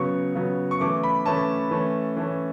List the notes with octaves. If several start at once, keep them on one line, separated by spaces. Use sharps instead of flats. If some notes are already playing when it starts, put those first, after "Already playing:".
Already playing: C#3 F#3 B3 C#6
C#3 F#3 B3
C#6
E3 A3 C#4 D6
B5
E3 A3 C#4 A5
E3 A3 C#4
E3 A3 C#4